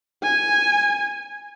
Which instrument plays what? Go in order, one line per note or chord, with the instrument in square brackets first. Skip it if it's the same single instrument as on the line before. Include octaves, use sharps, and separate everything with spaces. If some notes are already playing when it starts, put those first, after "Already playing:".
[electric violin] G#5